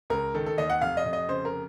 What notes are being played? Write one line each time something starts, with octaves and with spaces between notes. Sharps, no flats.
C#2 A#4
D#3 A4
A4
D#2 D#5
F#5
F1 F5
D#5
F1
D#5
C#3 C5
A#4